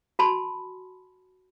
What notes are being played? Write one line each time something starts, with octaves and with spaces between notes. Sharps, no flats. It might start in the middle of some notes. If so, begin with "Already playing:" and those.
F#4 G#5 A5 B5 C6